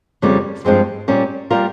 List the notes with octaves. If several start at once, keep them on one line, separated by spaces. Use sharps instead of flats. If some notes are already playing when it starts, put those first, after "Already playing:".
F2 C#3 G3 A#3
G2 F3 G#3 C4
A#2 G3 A#3 C#4
G3 A#3 F4 A#4